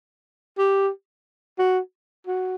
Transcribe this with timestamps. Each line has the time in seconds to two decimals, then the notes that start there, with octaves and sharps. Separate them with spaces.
0.58 G4
1.59 F#4
2.27 F#4